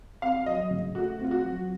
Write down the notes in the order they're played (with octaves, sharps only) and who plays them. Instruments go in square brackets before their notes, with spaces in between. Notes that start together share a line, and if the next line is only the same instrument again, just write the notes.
[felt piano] C4 [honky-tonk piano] F5
[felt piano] F#3 [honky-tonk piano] D#5
[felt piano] C#3
[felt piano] A3 [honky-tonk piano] F#4
[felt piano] C4 [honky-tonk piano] F4
[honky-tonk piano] F#4
[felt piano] F#3